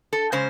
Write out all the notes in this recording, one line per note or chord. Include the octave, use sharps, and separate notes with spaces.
A4
C#3 G#3 C#4 C5